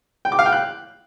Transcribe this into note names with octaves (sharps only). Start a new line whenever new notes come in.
G5
D6
F5
G5
F#6